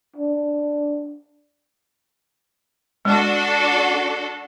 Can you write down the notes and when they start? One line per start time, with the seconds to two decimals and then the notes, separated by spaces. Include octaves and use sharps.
0.16 D4
3.05 G#3 D4 F#4 A4